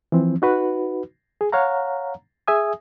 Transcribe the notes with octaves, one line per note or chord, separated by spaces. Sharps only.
E3 F3 C4
D#4 F#4 B4
G#4
C#5 F5 F#5 A#5
G#4 E5 G#5 D#6